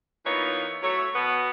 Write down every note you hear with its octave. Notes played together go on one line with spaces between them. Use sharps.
E3 A#3 B3 D#4 F4 C#5
F#3 A3 C#5
B2 B3